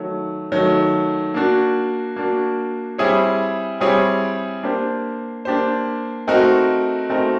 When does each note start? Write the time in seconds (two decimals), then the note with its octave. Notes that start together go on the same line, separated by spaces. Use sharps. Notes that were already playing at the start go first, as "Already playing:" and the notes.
Already playing: D#3 F#3 A3
0.52 D#3 F#3 A3
1.34 A#3 D4 F#4
2.16 A#3 D4 F#4
2.98 G3 C4 E4 G#4 C#5
3.80 G3 C4 E4 G#4 C#5
4.63 A#3 D4 G4 C5
5.45 A#3 D4 G4 C5
6.27 A3 C4 D#4 F#4 A#4
7.09 A3 C4 D#4 F#4 A#4